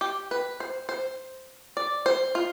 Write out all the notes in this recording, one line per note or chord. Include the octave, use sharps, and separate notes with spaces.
G4
B4
C5
C5
D5
C5
F4